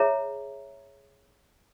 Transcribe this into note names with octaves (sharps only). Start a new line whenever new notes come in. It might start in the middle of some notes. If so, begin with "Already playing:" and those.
Already playing: G#4 C#5 E5 A#5